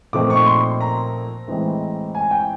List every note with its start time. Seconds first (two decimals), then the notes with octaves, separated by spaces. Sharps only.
0.13 A#2 F3 A3 C4 D#4 D6
0.30 C#6
0.47 C6
0.81 A#5
1.48 A2 E3 G#3 C4
2.15 G#5
2.31 G5